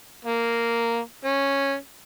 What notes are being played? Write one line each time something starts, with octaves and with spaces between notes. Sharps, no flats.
A#3
C#4